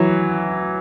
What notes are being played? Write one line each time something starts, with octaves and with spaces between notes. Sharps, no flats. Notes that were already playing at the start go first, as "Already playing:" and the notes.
Already playing: E3 F#3